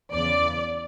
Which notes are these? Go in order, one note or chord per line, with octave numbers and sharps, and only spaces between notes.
E2 C#3 E3 D5